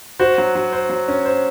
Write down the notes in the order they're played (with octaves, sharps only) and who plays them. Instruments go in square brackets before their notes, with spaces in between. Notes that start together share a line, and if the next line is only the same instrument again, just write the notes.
[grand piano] F#4 [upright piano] C5
[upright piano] F#3
F#3
C5
F#3
C#4
C5